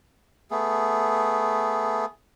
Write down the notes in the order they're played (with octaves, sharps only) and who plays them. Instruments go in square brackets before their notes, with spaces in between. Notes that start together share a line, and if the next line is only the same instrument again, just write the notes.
[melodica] A3 B3 G#4